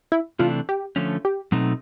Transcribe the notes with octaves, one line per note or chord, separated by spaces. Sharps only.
E4
C3 E3 A3 D4 F4
G4
D3 F3 A3 C#4
G4
B2 F#3 A3 C4 D#4